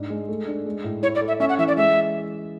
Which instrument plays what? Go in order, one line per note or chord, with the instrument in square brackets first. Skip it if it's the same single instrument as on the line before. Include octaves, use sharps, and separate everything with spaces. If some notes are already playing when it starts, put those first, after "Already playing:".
Already playing: [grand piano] G#2 D4
G#3
A3
D4
G#3
A2
[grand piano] E4 [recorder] C#5
[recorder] D5
[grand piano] A4
[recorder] E5
[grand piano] C#4 [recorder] E5
[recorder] F#5
[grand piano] E3 [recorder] E5
[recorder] D5
[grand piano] G#3 [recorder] E5